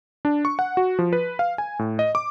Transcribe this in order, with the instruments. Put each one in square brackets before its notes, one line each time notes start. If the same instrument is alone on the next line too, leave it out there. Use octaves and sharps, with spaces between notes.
[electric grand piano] D4
C#6
F#5
F#4
F3
B4
F5
G#5
A2
D#5
D6